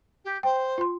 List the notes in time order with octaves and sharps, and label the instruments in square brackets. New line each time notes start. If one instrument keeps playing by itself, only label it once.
[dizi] G4
[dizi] C5 [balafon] G5
[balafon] F4 C6